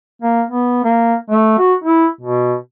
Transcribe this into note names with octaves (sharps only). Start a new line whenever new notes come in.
A#3
B3
A#3
A3
F#4
E4
B2